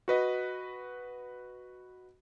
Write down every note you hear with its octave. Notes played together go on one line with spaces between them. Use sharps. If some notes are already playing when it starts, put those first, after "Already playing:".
F#4 B4 D#5